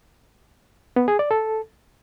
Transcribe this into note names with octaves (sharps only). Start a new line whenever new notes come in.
B3
G#4
D5
A4